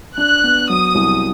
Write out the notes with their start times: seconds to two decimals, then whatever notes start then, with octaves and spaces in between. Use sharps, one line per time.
0.18 D4 F#6
0.44 B3
0.69 F#3 D#6
0.95 C2